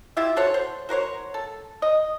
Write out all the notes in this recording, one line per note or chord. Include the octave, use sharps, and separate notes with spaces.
E4 F4 G4 E5
F#4 A4 C5 C#5
C5
F#4 A#4 C5 C#5
A4
D#5